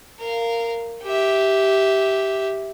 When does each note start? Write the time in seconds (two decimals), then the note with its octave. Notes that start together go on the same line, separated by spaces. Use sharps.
0.19 A#4 F5
1.03 G4 E5